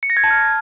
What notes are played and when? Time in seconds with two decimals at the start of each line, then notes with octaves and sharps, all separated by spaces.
0.03 C#7
0.10 A#6
0.17 G#6
0.24 A5
0.31 F6